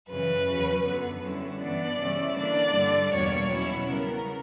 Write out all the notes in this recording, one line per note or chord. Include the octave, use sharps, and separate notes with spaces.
F#2 C#3 E3 B4
E2 C#3 F#3 C#4
F#2 D3 F#3 B3
D3 G3 C#4 E4
G2 E3 B3 D4 D5
C#3 E3 G3 C#4 E4
D3 A#3 D4 D5
G2 D3 G3
E2 B2 G3 A#3 D4 C#5
B2 F#3 C#4 E4
C#3 G3 B3 A#4